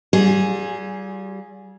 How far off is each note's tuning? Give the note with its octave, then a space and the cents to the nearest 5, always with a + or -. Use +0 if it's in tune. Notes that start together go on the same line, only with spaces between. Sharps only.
G3 -25 F4 +30 G#4 +0